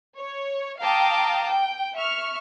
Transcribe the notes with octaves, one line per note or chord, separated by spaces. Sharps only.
C#5
F5 G5 A5 A#5 D6 D#6
G5
E5 C#6 F6